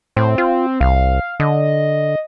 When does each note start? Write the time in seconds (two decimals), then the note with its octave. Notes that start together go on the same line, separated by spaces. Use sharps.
0.16 A2 C4
0.38 F4
0.81 C2 F5
1.40 D3 D#5